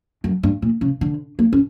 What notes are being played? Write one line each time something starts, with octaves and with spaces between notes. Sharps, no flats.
F#2
G2
A#2
C#3
D3
A#3
C#4